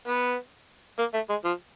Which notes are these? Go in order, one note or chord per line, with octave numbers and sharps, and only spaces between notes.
B3
A#3
A3
G#3
F3